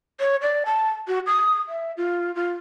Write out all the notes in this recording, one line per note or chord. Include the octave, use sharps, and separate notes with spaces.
C#5
D5
A5
F#4
D#6
E5
F4
F4